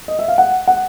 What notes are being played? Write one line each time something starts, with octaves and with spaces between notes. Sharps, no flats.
D#5
E5
F5
F#5
F#5